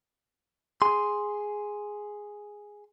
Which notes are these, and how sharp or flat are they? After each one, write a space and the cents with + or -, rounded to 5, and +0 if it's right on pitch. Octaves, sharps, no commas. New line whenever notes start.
G#4 +0 C6 +0